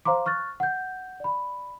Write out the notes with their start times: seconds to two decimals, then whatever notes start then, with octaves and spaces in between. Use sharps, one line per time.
0.05 C5 F5 A#5 C6 D6
0.26 C#6 F6 F#6 A6
0.60 F#5 G6
1.20 D5 B5